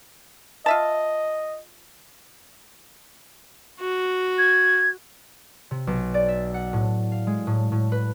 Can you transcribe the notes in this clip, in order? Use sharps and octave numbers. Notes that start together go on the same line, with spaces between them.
F4 D#5 E5 A5
F#4
G#6
C3
B1
D5
E5
F#5
A2
F5
G#3
A2
A2
B4